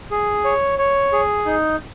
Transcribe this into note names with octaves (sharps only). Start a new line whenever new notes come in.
G#4
C#5
C#5
G#4
D#4